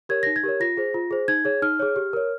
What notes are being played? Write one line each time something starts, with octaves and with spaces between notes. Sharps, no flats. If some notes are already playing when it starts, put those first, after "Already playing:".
G4 A#4 C#5 G#6
D#4 A#6
G#6
G4 A#4 C#5
F4 A#6
G#4 C5
F4
G#4 C5
D#4 G#6
G#4 C#5
D#4 F6
G#4 C#5
G4
A#4 C#5